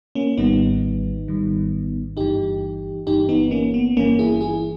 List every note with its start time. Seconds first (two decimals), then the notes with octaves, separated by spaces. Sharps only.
0.15 A#3 C#4
0.37 G#1 G#2 D#3 G3 B3 D#4
1.28 G#1 G#2 D#3 G3
2.17 G1 G2 E3 D#4 G4
3.07 G1 G2 E3 D#4 G4
3.29 B3 D#4
3.51 A#3 C#4
3.74 B3
3.96 G1 G2 E3 A#3 C#4
4.19 E4 G#4
4.41 E4 G#4